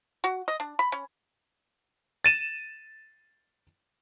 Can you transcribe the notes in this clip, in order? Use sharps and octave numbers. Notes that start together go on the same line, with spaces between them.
F#4
D#5
D4
B5
C#4
A6 D#7 E7